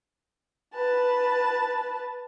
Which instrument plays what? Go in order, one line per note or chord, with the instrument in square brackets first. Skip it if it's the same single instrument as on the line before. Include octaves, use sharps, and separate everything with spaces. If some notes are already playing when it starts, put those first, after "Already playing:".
[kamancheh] B4 A5